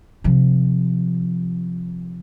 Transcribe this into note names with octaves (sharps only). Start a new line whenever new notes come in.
C3 F3